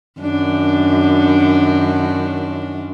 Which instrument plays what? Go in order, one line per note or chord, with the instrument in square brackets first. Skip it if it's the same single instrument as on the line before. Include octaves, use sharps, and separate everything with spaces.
[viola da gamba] F#2 D#3 D4